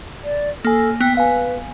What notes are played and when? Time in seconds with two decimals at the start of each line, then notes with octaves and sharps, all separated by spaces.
0.24 D5
0.65 A#3 A4 G#5
1.01 B3 G5
1.17 B4 F5 G#5